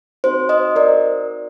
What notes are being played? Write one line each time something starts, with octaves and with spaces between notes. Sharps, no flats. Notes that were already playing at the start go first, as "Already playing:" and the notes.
C4 D#4 F#4 C5
C5 D#5
A#4 D5